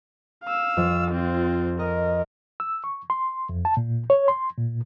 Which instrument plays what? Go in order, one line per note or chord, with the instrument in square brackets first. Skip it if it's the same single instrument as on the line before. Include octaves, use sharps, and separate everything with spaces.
[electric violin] F5 E6
[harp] F2
[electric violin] C4 F4
[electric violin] A#4 [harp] D#5
[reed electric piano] E6
C#6
C6
F2
A5
A#2
C#5
C6
A#2